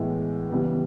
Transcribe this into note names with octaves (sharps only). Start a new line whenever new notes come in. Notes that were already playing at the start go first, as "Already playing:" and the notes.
Already playing: A2 E3 G#3 B3
C#3 E3 G3 B3